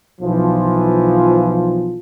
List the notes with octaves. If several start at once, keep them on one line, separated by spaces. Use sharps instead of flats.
B1 E3 F3